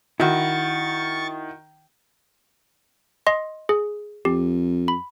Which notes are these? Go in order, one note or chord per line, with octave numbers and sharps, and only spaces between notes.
D#3 E4 F#4 C#6 A6
D#5 C6
G#4
F2 G4
B5